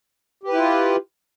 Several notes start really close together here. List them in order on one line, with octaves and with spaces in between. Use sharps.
G4 B4 E4 F4